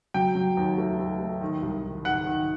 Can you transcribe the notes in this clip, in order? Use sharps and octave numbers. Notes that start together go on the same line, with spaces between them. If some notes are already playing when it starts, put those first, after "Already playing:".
F#3 G5
F#3
D#2
A3
A3
A3
D#3
C2
D#3
D#3 F#5
D#3